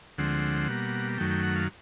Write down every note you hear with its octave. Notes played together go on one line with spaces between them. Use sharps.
D2 D3 F3 G#3 C4 F#5
B2 G3 A#3
F#2 D#3 F#3 A3 G5
G5
F#5
F5